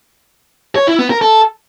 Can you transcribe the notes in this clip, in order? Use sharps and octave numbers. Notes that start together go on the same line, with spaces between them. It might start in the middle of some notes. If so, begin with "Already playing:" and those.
C#5
E4
B3
A#4
A4